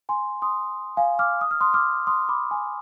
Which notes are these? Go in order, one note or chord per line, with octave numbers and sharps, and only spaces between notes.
G#5 C6
C6 D#6
F5 G#5
D6 F6
D#6
F6
C6 D#6
D6 F6
C6 D#6
B5 D6
G#5 C6